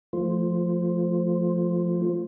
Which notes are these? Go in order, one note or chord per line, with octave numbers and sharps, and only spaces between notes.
F3 A3 F4 C5